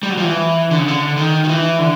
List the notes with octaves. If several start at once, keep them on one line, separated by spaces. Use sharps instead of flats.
G3
F#3
F3
E3
D3
C#3
D3
D#3
D#3
E3
D3